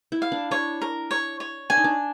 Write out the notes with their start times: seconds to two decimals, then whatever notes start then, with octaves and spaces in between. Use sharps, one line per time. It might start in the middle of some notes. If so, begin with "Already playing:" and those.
0.12 E4
0.22 F5
0.32 D4
0.51 D4 C#5
0.81 A#4
1.11 C#5
1.40 C#5
1.70 D4 G#5
1.77 D#4
1.84 D4